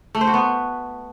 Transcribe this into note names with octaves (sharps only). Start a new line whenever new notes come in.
A3
C5
F#4
B3